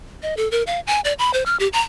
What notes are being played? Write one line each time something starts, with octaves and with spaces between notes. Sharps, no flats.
D#5
A4
A#4
F5
G#5
D5
B5
C5
F6
G4
A#5